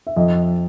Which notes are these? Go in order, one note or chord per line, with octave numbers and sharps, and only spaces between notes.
E5
F2 D#5